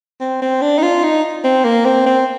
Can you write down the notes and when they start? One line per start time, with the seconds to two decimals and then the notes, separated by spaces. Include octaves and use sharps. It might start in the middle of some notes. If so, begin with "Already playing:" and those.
0.20 C4
0.42 C4
0.62 D4
0.78 D#4
0.82 F4
1.03 D#4
1.44 C4
1.64 A#3
1.85 C4
2.06 C4